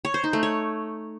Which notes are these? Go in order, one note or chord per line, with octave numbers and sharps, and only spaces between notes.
C#5
C5
D#4
A3
C#5